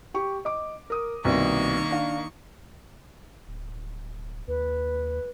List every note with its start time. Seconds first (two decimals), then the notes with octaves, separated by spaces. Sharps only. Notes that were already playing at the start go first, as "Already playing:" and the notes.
0.14 G4 C#6
0.45 D#5 D6
0.90 A#4 D#6
1.25 C2 B2 D#3 A#3 C#6
1.91 D4 F5
3.47 D1
4.48 D#2 B4